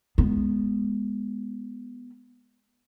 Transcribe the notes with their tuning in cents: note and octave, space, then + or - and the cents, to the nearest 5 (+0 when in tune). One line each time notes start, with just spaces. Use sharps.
G#3 +0 B3 +0